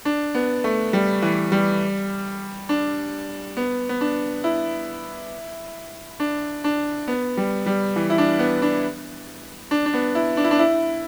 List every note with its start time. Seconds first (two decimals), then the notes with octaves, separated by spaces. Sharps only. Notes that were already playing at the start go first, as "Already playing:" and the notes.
0.05 D4
0.35 B3
0.64 A3
0.93 G3
1.22 E3
1.52 G3
2.69 D4
3.57 B3
3.89 B3
4.01 D4
4.44 E4
6.20 D4
6.64 D4
7.08 B3
7.37 G3
7.66 G3
7.96 E3
8.10 E4
8.18 D4
8.39 B3
8.62 D4
9.71 D4
9.86 D4
9.94 B3
10.15 E4
10.37 D4
10.44 E4
10.51 D4
10.59 E4